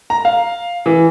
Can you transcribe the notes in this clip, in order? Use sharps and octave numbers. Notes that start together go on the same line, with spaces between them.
A#5
F5
E3